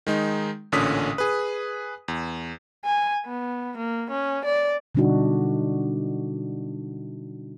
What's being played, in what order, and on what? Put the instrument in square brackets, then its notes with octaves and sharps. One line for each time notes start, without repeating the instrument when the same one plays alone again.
[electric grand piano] D#3 G#3 D#4
A1 A#2 D3 C#4 D#6 B6
G#4 B4
E2
[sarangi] G#5
B3
A#3
C#4
D5
[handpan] B2 D3 G3 D4 D#4 F#4